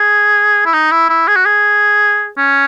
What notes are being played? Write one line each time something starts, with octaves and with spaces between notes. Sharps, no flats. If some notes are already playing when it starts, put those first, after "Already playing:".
Already playing: G#4
E4
D#4
E4
E4
G#4
F#4
G#4
C#4